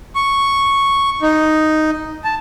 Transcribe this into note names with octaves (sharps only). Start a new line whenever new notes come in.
C#6
D#4
A5